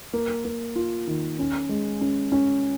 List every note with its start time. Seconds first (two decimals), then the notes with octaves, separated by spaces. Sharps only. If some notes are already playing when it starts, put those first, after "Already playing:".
0.13 A#3
0.45 A#3
0.76 F4
1.07 D#3
1.39 C#4
1.69 G#3
2.01 C#4
2.32 C#4